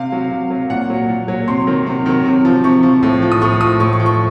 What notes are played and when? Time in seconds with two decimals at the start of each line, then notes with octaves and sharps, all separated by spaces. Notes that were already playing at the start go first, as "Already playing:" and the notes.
Already playing: C3 F5
0.12 F#3
0.31 C3
0.50 F#3
0.70 A#2 F#5
0.90 F#3
1.09 A#2
1.28 F#3
1.48 C3 C6
1.67 D#3 F#3
1.87 C3
2.06 D#3 F#3
2.25 C3
2.45 F3
2.64 C3 C#6
2.83 F3
3.03 A2
3.22 F3
3.32 D#6
3.42 A2 C#6
3.61 F3 D#6
3.80 A2 C#6
3.93 C#6
4.00 F3
4.06 C#6